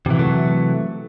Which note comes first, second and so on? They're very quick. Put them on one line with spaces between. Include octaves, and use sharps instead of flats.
C3 E3 F#3 A3